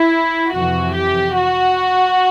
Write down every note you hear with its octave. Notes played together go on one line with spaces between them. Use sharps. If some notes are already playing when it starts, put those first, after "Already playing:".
Already playing: E4
F2 C3 E3 F#4
G4
F#4